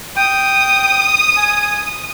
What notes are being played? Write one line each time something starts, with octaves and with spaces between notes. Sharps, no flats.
G5 D#6
G#5